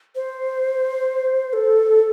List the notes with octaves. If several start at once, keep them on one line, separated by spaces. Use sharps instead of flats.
C5
A4